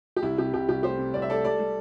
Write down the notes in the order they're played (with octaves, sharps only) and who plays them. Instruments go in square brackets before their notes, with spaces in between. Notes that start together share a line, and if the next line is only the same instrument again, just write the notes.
[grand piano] G4
C2 E4
C3 G4
C2 G4
C2 G4
A3 G4 C5
C3
C2 D5
E5
A3 A4 D5
G3 A4 D5
G3